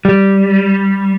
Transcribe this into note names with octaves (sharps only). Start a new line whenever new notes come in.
G3